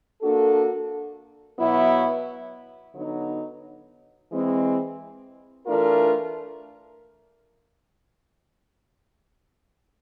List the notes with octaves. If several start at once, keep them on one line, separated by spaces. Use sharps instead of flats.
A#3 D4 F#4 A4
B2 F#3 B3 E4
D3 F#3 B3 D#4
E3 G#3 C4
E3 A3 D4 F4 A#4